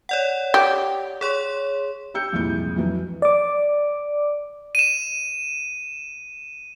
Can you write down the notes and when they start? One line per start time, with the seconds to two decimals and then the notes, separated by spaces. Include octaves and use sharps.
0.09 C#5 D5 F#5
0.54 G4
1.21 G#4 C#5 C6
2.14 G4 E6 G6 C#7
2.33 C2 F2 A#2 G#3 E4 G6
2.77 F2 E3 F#3
3.22 D5 D6
4.75 D#7 E7